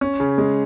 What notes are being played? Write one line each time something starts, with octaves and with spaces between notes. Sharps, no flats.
C#4
C#3
G#3